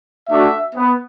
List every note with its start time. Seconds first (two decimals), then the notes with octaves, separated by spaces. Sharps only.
0.30 A3 D4 F#4 E5
0.76 B3